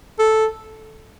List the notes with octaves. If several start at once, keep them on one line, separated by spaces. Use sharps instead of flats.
A4